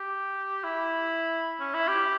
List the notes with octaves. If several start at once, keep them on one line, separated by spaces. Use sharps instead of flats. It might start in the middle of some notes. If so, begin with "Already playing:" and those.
Already playing: G4
E4
C#4
E4
G4